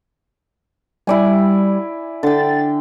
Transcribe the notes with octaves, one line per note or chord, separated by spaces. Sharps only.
G3 E4 D5 G#5
D3 G5 A6